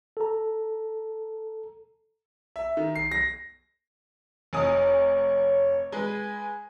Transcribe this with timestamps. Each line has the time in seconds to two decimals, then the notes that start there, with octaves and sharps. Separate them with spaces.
0.17 A4 A#5
2.56 E5
2.77 D#3
2.96 C7
3.12 A#6
4.53 F1 C#5 G#5 D#6
5.92 G#3 B4 G#5